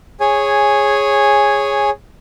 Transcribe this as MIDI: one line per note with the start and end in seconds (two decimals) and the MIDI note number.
0.20 1.90 68
0.20 1.90 73
0.20 1.90 80